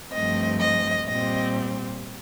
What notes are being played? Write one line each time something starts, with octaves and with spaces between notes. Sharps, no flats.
G2 F3 A3 C4 D#5
D#5
A#2 G3 C4 D#5